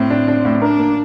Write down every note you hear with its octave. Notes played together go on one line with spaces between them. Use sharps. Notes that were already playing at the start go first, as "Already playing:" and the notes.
Already playing: A2 C4
D4
D4
A2
D4 A#4
A#3